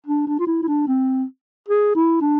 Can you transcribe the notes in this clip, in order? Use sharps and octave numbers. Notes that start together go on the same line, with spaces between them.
D4
D4
F4
E4
E4
D4
C4
G#4
E4
D4